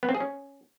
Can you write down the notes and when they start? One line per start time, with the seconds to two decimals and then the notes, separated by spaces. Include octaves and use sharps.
0.03 B3
0.09 C4
0.15 G#4
0.20 C#4